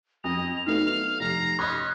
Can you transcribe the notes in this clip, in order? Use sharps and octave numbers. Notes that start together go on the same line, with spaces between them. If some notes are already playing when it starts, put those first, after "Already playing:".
F2 D#5 F7
F#3 A3 B3 D#4 F5
F1 A#5 C7
C#4 D#5 B5 C6 D#6 F#6